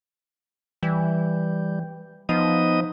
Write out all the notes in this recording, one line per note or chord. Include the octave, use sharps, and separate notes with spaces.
E3 G3
F3 B3 D#4 D#5